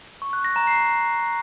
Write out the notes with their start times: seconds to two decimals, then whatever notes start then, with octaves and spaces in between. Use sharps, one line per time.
0.22 C#6
0.33 F#6
0.45 A#6
0.56 A#5
0.67 C7